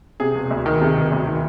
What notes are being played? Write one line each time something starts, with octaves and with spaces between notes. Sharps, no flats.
C3 G#4
E1
D2
D#3
C3 G#4
E1
D2
D#3